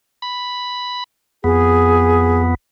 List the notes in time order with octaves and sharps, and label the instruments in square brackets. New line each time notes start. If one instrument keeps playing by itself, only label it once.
[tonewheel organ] B5
[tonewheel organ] F2 B3 [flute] G#4